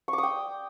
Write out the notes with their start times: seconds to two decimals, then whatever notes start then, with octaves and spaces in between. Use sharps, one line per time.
0.08 C#6
0.13 D6
0.18 D#6
0.23 G5